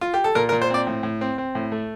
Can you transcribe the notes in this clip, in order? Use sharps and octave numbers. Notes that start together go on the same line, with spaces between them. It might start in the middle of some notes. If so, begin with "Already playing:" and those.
F4
G4
A4
A#2 A#4
A#4
A#2
C5
C4 D5
A2
A2
C4
C4
A2
A3